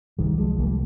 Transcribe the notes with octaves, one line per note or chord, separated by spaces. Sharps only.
C2 D#3 G3
F3 G#3
C2 G3 A#3